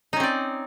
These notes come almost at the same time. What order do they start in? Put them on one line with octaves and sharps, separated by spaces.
D#4 C#4 C4 D5